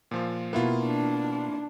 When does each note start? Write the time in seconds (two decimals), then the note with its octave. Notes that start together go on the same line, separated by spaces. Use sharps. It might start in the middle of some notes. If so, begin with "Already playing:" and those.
0.11 A#2 F3 F4
0.53 B2 A#3 B3 E4 F4
0.84 D4